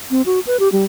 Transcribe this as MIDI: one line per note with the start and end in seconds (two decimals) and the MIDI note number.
0.11 0.22 60
0.26 0.40 66
0.47 0.57 71
0.60 0.69 67
0.72 0.84 55